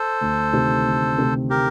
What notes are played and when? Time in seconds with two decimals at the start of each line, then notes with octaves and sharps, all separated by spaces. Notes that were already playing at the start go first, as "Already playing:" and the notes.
Already playing: A4 C5
0.21 D2
0.53 C3 D#3 A3 C4
0.85 D2
1.18 C3 D#3 A3 C4
1.50 G4 A#4